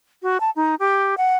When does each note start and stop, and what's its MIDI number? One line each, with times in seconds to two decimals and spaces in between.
0.23 0.38 66
0.40 0.50 81
0.56 0.75 63
0.79 1.15 67
1.17 1.37 78